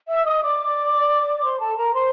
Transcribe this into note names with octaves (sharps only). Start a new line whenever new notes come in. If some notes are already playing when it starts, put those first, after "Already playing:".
E5 E6
D#5 D#6
D5 D6
C5 C6
A4 A5
A#4 A#5
C5 C6